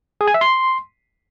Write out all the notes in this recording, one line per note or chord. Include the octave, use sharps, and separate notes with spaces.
G#4
G#5
E5
C6